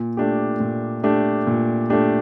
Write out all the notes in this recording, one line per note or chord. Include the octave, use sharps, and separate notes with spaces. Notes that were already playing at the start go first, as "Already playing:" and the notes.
Already playing: A#2
A3 D4 G4
A#2
A3 D4 G4
A#2
A3 D4 G4